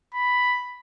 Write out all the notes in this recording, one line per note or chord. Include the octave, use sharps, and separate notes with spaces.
B5